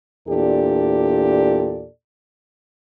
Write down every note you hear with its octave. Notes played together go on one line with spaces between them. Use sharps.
E2 A#2 D4 G4 A4 D5